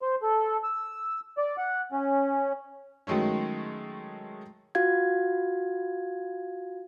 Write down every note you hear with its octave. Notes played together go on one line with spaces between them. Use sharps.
C5
A4
E6
D5
F#5
C#4
D#3 F#3 G#3 A3 C#4
F4 F#4 F5 G#6